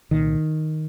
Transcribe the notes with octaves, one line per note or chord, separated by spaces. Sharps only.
C2 A#2 D#3